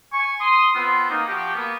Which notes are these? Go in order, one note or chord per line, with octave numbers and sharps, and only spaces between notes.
G#5 C#6
C6 D#6
B3 C4 F4 C6
A#3 D#4
F3 F#4 G4
A#3 B3